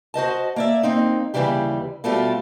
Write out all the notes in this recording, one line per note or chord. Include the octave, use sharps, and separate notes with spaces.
F#4 C5 D#5 A5
A#3 D5 E5
A#3 C4 D#4
D#2 A#2 C#3 E3 G3 G4
B2 G3 A3 B3 F4 G4